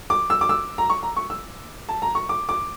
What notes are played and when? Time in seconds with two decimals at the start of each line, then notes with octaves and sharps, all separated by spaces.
0.10 D6
0.30 E6
0.41 D6
0.49 E6
0.78 A#5
0.90 C#6
1.03 A#5
1.16 C#6
1.30 E6
1.89 A5
2.02 A#5
2.15 C#6
2.29 D6
2.49 D6